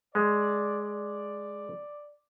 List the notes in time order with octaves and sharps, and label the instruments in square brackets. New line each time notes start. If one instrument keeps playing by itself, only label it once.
[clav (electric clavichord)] G#3 [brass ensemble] D5
[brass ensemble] D5